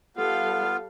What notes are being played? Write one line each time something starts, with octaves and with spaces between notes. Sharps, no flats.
G3 B3 F4 A4 F5